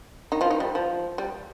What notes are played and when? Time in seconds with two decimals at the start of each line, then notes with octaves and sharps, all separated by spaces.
0.32 D#3 D#4
0.41 F3 F4
0.50 D#3 D#4
0.60 G3
0.75 F3
1.18 G3